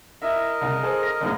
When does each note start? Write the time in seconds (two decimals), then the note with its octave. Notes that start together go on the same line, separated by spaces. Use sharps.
0.22 E4 A#4 D#5 E5
0.61 C2 C#3
0.83 G#4 A4 C5
1.03 F6 A#6
1.21 F#1 F#2 A2